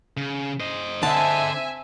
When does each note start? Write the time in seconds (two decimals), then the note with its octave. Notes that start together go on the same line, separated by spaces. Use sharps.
0.17 C#3
0.60 C5 D#5
1.03 D3 C4 E5 G#5 A5